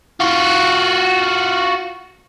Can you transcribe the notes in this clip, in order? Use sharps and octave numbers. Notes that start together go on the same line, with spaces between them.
F4 F#4